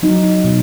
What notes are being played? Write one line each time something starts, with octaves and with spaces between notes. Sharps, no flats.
F#3 D#4
B2